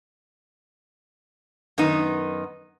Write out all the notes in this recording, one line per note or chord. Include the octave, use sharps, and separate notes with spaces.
F#2 D#3 B3 D#4